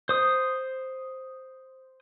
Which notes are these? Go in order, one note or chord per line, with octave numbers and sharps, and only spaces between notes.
C5 D#6